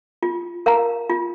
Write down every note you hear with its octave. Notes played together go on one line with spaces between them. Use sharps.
F4
A#4 F5 A#5
F4